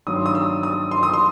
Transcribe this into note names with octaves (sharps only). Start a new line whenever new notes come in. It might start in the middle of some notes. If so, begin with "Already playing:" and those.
G2 D#3 F#3 D#6
C6
D#6
E6
D#6
C6
D#6
C6